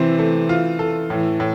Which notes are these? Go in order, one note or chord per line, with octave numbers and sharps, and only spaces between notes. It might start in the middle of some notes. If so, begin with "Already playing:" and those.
Already playing: C3 E3 C4
A3
F4
A4
A2 E3
A2